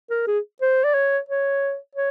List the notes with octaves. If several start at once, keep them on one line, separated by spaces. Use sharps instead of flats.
A#4
G#4
C5
D5
C#5
C#5
C#5